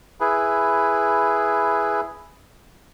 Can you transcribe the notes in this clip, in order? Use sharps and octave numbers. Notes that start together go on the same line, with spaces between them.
E4 G#4 B4